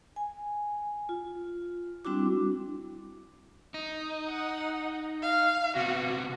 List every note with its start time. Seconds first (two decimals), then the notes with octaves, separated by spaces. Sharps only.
0.16 G#5
1.09 F4
2.05 G3 C4 D4 E4 F#4 D6
3.74 D#4
4.29 F#5
5.23 F5
5.76 C3 B3 F#4